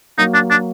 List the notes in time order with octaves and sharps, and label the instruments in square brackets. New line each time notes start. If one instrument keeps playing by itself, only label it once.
[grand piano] F#3 A#3 [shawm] D#4
[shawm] D4
D4